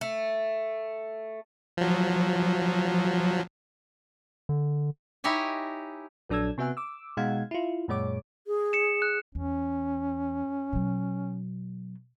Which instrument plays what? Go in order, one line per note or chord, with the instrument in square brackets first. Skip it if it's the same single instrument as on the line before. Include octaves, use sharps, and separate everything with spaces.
[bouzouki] A3
[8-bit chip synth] F3 F#3
[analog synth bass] D3
[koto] D#4 E4 G4 C#5 G#5
[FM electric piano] A#1 F#3 D4 A4 E6 G#6
C3 B3 F#4 E5 G#5 F#6
D6 E6
B2 G#3 D#4 F5 F#5 G#6
E4 F4
F#2 A#2 G#3 C#5 D6
[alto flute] G#4
[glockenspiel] C#7 E7
F#6
[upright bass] E2 [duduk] C#4
[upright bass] B2 F#3